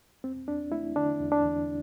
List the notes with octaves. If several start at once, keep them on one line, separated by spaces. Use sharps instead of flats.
E2 C4
E2 D4
A3 E4
D3 D4
E2
D4
E2